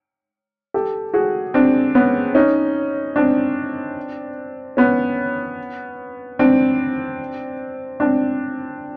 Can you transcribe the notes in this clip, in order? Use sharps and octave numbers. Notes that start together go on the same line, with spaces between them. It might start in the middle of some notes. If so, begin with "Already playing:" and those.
G4 A4
F#4 G#4
C4 D4
B3 C#4
C#4 D#4
C4 D4
B3 C#4
C4 D4
C4 D4